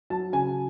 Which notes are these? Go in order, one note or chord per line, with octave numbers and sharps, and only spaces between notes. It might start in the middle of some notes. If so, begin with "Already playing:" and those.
F#3 A5
C#3 G#5